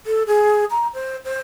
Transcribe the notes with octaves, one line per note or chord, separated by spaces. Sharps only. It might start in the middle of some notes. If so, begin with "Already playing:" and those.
A4
G#4
A#5
C5
C5